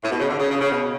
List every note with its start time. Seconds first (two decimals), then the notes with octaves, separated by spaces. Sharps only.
0.03 A2
0.11 B2
0.20 C#3
0.29 D3
0.39 C#3
0.50 C#3
0.60 C#3
0.70 B2